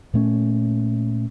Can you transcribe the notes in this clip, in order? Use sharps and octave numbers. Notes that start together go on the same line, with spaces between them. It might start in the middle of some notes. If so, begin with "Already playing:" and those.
A#2 A3 C#4